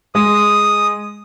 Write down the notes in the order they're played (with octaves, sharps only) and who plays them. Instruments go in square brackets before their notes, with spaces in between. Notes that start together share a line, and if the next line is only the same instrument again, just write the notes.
[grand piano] G#3 [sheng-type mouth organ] D#6